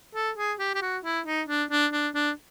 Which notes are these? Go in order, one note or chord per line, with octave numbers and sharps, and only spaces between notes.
A4
G#4
G4
G4
F#4
E4
D#4
D4
D4
D4
D4